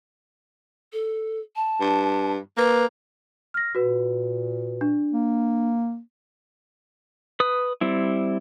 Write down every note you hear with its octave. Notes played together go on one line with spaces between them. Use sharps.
A4
A5
G2
A#3 B4
F6 A#6
A#2 F#4 B4
D4
A#3
B4 D#6
G3 C4 E4